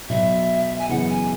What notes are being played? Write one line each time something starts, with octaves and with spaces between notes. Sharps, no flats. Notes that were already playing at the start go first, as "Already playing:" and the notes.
B1 B2 F#3 E5
G#5
F#2 C#3 E3 B3 F#5
G#5